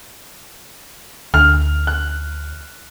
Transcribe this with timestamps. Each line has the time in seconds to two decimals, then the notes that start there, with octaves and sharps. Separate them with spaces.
1.34 D2 F6
1.87 F#6